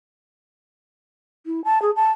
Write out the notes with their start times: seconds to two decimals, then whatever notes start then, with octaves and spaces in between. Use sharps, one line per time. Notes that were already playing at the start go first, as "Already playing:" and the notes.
1.46 E4
1.65 A5
1.82 G#4
1.96 A5